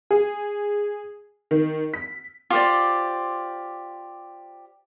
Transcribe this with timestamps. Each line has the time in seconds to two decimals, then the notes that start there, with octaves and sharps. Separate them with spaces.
0.11 G#4
1.51 D#3
1.94 B6
2.50 F4 G4 C5 D5